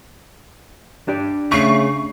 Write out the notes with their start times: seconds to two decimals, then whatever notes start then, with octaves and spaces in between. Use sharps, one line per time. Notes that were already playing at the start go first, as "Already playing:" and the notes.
1.08 D4 G4 D5
1.52 C#3 A3 C#6 C7